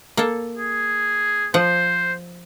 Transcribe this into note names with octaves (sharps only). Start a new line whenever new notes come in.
A#3 A4
G#4
F3 C5 F#5